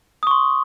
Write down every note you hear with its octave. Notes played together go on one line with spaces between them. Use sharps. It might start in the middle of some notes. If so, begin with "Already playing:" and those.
C6 C#6 D#6